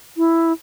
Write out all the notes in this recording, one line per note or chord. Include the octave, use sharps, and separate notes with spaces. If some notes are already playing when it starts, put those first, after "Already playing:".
E4